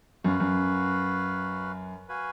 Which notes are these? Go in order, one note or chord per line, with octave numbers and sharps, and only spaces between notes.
F#2 F#4 B4 F5
F#2
F#4 B4 F5 G#5